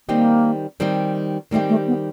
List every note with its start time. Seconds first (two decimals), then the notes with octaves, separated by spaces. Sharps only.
0.08 D#3 G3 A#3 C4 D#4 G4
0.80 D#3 G3 C4 D#4 G4
1.51 D#3 G3 A3 C4 D#4 G4
1.69 A3
1.87 B3